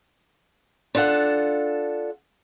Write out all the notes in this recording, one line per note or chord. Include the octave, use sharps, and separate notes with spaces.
D4 F4 A4 F#5